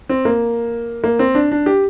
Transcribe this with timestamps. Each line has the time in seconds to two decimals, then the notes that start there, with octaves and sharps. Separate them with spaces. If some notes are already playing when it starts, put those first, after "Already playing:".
0.09 C4
0.25 A#3
1.04 A#3
1.19 C4
1.35 D4
1.52 D4
1.66 G4